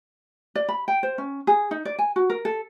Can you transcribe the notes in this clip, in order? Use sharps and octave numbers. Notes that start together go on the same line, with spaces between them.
D5
B5
G5
C5
C#4
G#4
D#4
D5
G#5
F#4
A#4
A4